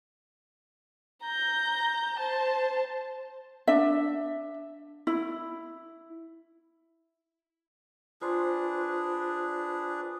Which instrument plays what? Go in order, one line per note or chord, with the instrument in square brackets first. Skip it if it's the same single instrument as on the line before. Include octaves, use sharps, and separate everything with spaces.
[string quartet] A#5 G6
C5 A5
[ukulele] D4 E5
E4
[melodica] D4 G#4 B4 [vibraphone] F4 C5 C6